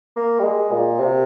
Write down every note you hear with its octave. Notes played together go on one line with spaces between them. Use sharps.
A#3
G3
G#3
A#2
C3